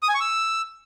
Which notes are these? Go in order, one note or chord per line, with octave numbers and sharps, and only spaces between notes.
D#6
G#5
C#6
E6